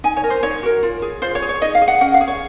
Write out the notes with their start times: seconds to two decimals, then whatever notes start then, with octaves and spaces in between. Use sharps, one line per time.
0.04 D#4 G#5
0.17 C#5
0.24 A#4
0.30 C5
0.43 D#4 C#5
0.63 F#4 A#4
0.83 F4
1.02 G#4
1.22 F4 C5
1.35 C#5
1.42 G#4
1.49 C#5
1.62 D#4 D#5
1.75 F5
1.81 G#4
1.88 F#5
2.01 C#4 F#5
2.14 F5
2.21 G#4
2.28 C#5